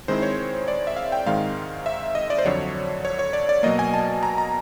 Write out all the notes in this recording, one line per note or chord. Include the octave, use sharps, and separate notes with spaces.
D#3 G#3 C4 E4 C5
C#5
D5
E5
F5
G5
G#2 D#3 G#3 C4 F5
E5
D#5
D5
C5
F2 D3 F#3 C#5
C#5
C#5
D5
D5
B2 F#3 A#3 D#5
G#5
A5
A#5
A#5